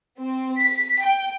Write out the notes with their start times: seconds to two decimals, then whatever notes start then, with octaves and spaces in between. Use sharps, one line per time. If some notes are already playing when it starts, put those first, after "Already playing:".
0.19 C4
0.62 B6
1.03 G5